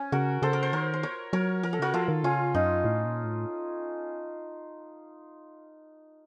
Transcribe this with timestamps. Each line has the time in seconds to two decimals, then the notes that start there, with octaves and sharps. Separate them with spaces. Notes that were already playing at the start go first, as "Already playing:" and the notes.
Already playing: C#4
0.12 C#3 F#4 A#4
0.42 C#3 A4 C5
0.53 A#4
0.63 C5
0.73 D#3 A#4 C#5
0.94 C5
1.03 A#4 C#5
1.33 F#3 A#4 C#5
1.63 F3 A#4
1.73 A4
1.79 C#3 F#4 A#4
1.94 F3 F4 A4
2.08 D#3
2.23 C#3 C#4 F4
2.55 F#2 D#4
2.85 A2
3.05 A#2
3.24 A2